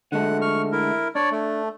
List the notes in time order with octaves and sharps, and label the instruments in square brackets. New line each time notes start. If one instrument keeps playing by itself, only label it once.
[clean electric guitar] D3 G#3 A3 [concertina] F#5
[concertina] C#6 F6
E4 A#4
[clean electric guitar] D4 [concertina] C#5 D5
[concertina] A3